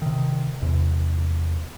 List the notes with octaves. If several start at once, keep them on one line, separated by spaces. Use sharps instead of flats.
C3 D#3
E2 C3